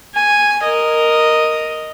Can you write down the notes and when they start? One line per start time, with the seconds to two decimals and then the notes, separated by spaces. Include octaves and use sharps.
0.14 G#5
0.63 A#4 D#5